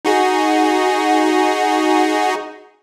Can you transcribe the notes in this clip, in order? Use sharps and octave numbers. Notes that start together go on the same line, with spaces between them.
D#4 F#4 G#4